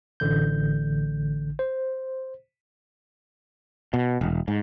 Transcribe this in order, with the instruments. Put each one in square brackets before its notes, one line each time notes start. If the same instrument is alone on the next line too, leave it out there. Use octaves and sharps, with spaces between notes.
[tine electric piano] A1 D3 G6
C5
[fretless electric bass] B2
E1
G#2